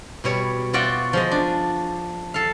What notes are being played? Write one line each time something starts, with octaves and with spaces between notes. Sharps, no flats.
B2 G3 C#5
F4 F#4 D5 E5 G5
F3 G#3 D#5
D4
A4 F5